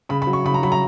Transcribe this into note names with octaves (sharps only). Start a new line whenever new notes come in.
C#3 B5
B5
F#3
C#6
C#3 B5
A#5
F#3 B5
A#5